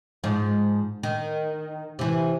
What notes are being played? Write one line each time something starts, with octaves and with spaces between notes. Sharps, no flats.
G#2 F3
D#3
C3 E3